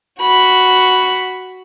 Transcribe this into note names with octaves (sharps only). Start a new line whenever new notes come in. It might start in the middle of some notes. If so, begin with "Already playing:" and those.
F#4 B5